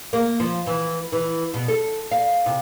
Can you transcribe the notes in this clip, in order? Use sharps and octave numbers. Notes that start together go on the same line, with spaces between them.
A#3
F3
E3
E3
B2
A4
F5
C3